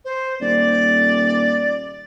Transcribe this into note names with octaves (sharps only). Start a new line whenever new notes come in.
C5
D#1 D5